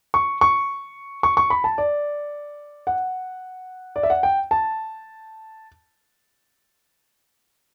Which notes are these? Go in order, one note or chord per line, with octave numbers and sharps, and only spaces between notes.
C#6
C#6
C#6
C#6
B5
A5
D5
F#5
D5
E5
F#5
G5
A5